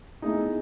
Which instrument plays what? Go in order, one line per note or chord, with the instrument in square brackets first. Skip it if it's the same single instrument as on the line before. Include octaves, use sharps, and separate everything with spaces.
[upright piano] B2 A3 E4 G#4 [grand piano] D#4